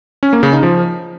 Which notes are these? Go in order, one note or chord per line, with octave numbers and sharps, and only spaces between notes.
C#4
A#3
C#3
D#4
F3